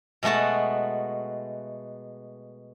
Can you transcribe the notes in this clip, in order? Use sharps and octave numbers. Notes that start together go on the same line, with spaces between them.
B2 G#3 A3 F#4 A5